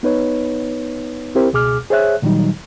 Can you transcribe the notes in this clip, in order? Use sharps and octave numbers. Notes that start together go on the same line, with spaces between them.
B3 D#4 B4 C#5
C4 E4 G4 A#4 C5
C#2 B2 G#4 D6 F6
G#4 C5 C#5 E5 F#6
A#2 D#3 F#3 G3 D#4